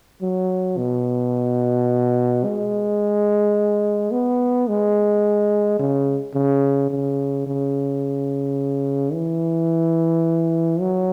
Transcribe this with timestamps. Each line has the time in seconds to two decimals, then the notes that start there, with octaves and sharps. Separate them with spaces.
0.22 F#3
0.78 B2
2.45 G#3
4.11 B3
4.68 G#3
5.79 C#3
6.34 C#3
6.90 C#3
7.47 C#3
9.13 E3
10.80 F#3